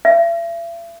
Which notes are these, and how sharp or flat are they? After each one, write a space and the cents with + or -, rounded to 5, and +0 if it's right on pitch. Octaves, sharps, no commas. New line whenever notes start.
E5 +40